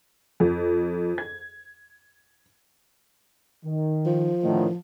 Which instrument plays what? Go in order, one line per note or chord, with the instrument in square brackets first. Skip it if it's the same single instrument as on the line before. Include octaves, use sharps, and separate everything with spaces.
[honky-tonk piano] F2
G#6
[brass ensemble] D#3
[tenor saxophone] F3
[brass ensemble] A2 D3 D#3